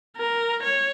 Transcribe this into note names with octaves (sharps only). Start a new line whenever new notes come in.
A#4
C#5